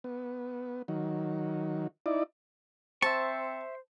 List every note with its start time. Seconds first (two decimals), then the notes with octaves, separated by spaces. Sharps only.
0.04 B3
0.88 D#3 F#3
2.06 D#4 E4 D5
3.02 C4 C5 E5 A5 C#6